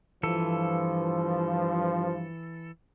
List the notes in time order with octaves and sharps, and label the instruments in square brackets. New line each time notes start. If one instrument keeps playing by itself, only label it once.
[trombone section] G2 F3 [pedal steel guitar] E3 A4